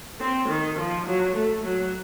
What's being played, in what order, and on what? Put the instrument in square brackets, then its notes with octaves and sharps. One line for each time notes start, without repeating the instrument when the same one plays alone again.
[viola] C4
D#3
F3
F#3
A3
F#3